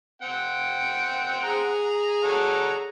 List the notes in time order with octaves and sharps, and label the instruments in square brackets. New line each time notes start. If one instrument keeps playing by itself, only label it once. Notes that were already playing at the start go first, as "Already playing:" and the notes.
[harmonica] C4 F#5 G5
[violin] G#4 A#5
[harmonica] A4 C#5 F#5